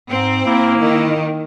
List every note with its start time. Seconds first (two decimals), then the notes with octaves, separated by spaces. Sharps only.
0.11 G#2 C4
0.46 A#3 E4
0.81 D#3